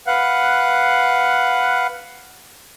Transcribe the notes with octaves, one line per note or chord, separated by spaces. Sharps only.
B4 F5 F#5 F#6